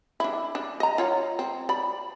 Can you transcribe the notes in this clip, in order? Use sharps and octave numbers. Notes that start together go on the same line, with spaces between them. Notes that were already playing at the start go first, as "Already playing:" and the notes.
D4 E4
D4
D#5 A#5
F4 C#5 F#5
C4
D5 B5